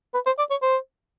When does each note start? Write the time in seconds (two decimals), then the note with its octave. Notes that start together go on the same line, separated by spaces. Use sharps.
0.14 B4
0.26 C5
0.38 D5
0.51 C#5
0.62 C5